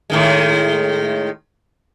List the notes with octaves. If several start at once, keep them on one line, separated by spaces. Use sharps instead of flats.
A2 D#3 G#3